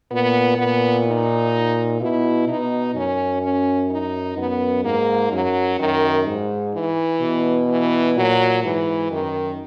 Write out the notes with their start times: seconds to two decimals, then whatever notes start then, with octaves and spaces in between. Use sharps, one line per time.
0.11 A#2 B3
0.58 A#2 B3
1.06 D#4
2.01 B2 E4
2.48 B2 D#4
2.95 F#2 C#4
3.42 C#4
3.90 D#4
4.37 F#2 B3
4.84 G#2 A#3
5.32 F#2 F#3
5.79 F#2 D#3
6.27 G#2
6.75 E3
7.21 B2
7.69 E3
8.17 A#2 F#3
8.63 G#2 E3
9.11 F#2 D#3